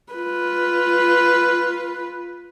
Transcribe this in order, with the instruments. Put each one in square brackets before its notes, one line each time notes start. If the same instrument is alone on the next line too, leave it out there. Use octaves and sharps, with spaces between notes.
[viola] F4 B4